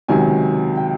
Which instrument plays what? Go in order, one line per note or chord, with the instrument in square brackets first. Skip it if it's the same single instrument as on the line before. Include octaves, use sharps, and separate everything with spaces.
[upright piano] C#2 C3 D#3 F#3 G#5
G5